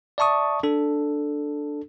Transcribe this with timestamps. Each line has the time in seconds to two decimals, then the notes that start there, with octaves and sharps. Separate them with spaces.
0.18 D5 E5 A5 C#6 D#6
0.63 D4 A4